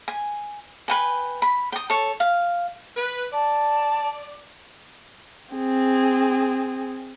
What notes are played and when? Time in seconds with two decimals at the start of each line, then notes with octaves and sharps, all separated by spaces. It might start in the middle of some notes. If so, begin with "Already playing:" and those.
0.08 G#5
0.88 B4 G5 G#5
1.42 B5
1.72 G5 D#6
1.90 A4 C#5
2.20 F5
2.96 B4
3.33 D5 A5
5.55 C4 G#4